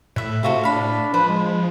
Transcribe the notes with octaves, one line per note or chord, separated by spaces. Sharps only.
A2 B4 E5
A2 C3 F4 F#4 A4
D4 F5 B5
F3 B4 C5
G#3